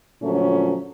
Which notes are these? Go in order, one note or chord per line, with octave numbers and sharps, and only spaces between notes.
A#2 D3 F3 F#3 A3 C#4